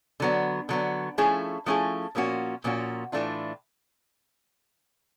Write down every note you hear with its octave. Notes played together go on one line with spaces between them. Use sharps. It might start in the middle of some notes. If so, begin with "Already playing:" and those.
D3 F#3 B3
D3 F#3 B3
F3 A3 C#4 E4 G#4
F3 A3 C#4 E4 G#4
A#2 F3 A#3 C#4 F#4
A#2 F3 A#3 C#4 F#4
A2 E3 A3 D4 F4